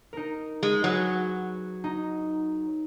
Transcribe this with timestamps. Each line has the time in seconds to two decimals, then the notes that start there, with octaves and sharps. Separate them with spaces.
0.13 D#4 A#4
0.63 G#3
0.84 F#3 F#4 G#4 B4
1.84 D#4